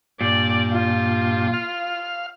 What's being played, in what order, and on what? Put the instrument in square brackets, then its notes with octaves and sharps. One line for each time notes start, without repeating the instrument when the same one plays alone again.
[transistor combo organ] G2 [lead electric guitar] A#2 [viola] D5
[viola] F4
[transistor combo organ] F5